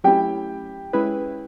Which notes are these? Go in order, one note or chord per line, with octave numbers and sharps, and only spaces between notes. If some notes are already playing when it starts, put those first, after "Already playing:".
F#3 A3 C#4 E4 G4 G5
G#3 C#4 E4 G#4 B4